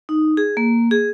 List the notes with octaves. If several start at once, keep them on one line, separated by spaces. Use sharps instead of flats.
D#4
G#4
A#3
G#4